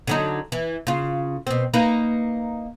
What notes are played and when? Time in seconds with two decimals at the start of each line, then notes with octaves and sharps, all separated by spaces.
0.07 D3 F#3 D#4
0.52 E3
0.87 C#3 F4
1.47 B2 C4
1.74 A#3 D#4 B4